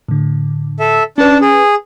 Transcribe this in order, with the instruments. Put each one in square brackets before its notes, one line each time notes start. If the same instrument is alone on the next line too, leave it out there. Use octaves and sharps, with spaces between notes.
[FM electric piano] A2 D3
[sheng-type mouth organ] A4 E5
[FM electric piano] C#4 B4 [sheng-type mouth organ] D4 A5
[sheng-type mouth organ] G#4